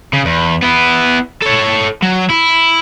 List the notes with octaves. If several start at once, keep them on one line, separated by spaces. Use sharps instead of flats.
C#3
E2
B3 E4
A4 C#5
F#3
E4